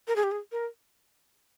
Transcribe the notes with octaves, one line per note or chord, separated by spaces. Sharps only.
A#4
G#4
G4
G#4
A#4